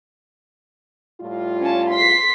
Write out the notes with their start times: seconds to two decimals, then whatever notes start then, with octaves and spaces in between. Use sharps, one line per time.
1.21 A2 G3 F4
1.62 C#4 A5
1.92 C6 B6 C7